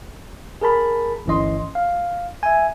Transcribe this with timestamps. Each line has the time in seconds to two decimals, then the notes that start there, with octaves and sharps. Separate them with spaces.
0.61 G#4 A#4 A5 B5
1.26 G1 D2 E3 C#4 D#5 C6
1.75 F5
2.43 E5 G#5